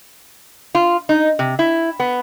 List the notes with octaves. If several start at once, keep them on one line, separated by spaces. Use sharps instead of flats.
F4
D#4
C3
E4
B3